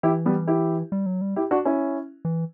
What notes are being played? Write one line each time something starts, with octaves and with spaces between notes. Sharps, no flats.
E3 E4 G4
G3 B3
E4 G4
G3
F#3
G3
E4 G4
D4 F#4
C#4 E4
E3